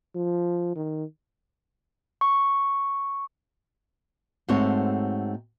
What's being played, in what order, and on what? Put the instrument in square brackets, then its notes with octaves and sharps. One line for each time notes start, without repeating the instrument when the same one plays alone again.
[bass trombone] F3
D#3
[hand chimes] C#6
[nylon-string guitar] G#2 A3 C4 F#4 A4 C#5